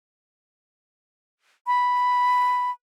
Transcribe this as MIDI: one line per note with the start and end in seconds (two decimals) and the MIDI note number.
1.67 2.71 83